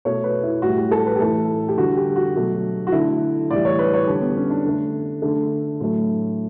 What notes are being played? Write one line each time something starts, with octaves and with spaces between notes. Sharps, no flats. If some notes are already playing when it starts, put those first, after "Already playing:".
B2 A3 C#5
B4
E4
A2 G3 F#4
G4
A4
B4
G4
A2 E3 A3 A4
G4
D3 G3 F#4
G4
F#4
B2 F#3 A3
F#4
D3 A3 E4
A2 E3 G3 D5
C#5
B4
C#5
D3 G3 A4
B3
C#4
D4
D3 A3
D3 A3
A2 F#3 A3